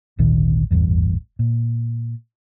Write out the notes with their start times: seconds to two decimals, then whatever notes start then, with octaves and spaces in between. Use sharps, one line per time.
0.19 G#1 D2 A#2 D#3
0.71 D#1 A1 E2 G2
1.39 A#2